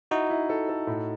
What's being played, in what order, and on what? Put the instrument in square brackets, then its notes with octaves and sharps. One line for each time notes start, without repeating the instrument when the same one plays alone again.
[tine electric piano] D#4 F#4 [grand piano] E4
[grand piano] E4
A4
A4
A2